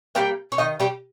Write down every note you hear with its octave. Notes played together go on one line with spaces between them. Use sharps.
G3 A#3 G4 G5
C#5
D#3 D#4 D#5
G3 G4